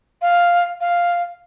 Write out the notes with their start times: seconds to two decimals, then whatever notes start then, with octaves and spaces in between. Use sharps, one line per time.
0.22 F5
0.81 F5